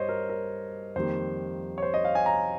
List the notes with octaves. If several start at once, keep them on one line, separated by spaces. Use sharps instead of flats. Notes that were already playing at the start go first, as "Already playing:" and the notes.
Already playing: G2 G3 C5 C#5 D#5
A#4
A#4
F2 D#3 G3 A#3 C5
C#5
C5
D#5
F5
G#5
A#5